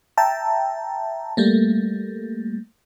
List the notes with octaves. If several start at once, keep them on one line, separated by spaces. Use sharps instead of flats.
E5 G5 A5 A#5
G3 A3 A#3